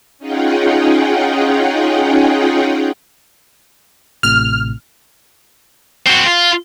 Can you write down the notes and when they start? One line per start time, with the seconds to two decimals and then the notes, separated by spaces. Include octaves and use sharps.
0.19 C#4 D#4 F4 G#4 F#5 G5
4.23 A1 A2 C3 F6
6.07 C4 F#4
6.26 F4